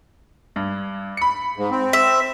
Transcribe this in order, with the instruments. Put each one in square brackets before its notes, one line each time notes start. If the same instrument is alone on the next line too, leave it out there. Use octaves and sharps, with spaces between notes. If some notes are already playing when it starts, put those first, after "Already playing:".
[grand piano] G2
B5 C#7
[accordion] G#2
C4
[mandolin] E5